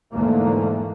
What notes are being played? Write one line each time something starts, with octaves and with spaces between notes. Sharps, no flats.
E2 G#2 D3 A3 A#3